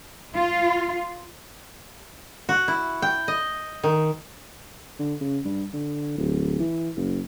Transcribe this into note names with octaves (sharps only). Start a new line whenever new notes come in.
F4
F#4
E4
G5
D#5
D#3
D3
C#3
G2
D3
D1
E3
F#1